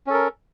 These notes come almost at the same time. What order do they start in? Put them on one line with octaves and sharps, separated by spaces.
C#4 A4 A#4